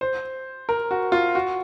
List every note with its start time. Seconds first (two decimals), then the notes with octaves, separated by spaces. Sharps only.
0.01 C5
0.69 A#4
0.91 F#4
1.12 F4
1.35 F#4